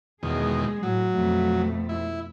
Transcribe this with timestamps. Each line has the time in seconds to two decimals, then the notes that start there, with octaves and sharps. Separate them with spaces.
0.23 E2 B2 D#3 G#3 G#4
0.83 A2 F#3
1.14 F2 B2 A3
1.89 E4